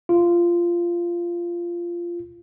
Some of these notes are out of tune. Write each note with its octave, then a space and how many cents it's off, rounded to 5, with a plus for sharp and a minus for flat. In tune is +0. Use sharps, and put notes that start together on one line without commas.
F4 -15